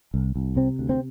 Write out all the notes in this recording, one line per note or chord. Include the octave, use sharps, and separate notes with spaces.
C2
C2
C3 C4
D2
C4